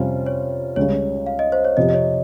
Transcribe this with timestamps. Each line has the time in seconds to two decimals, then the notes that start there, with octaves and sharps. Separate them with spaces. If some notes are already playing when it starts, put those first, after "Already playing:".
Already playing: F2 C3 G3 C#4 F4 C5
0.26 C#5
0.76 C#2 C#3 G3 C#5
1.26 F5
1.39 D#5
1.52 C5
1.64 C#5
1.77 F2 C3 F3 C4 G4 D#5
1.89 D#5
1.94 C#5